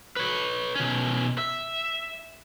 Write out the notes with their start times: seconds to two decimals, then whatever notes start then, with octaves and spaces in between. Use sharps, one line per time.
0.16 B4 C#5
0.76 B2 C#4
1.38 E5